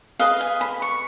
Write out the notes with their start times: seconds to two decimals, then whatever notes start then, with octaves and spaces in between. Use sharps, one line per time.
0.19 G#4 B4 D#5 F5
0.40 G#5
0.61 B5
0.82 C#6